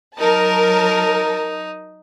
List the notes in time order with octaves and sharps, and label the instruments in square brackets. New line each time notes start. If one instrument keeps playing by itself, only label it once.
[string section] F#3 A#4 A5 [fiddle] D#4